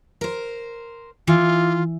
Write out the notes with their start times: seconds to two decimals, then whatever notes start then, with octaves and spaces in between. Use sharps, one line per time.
0.21 A#4 C5
1.27 E3 F4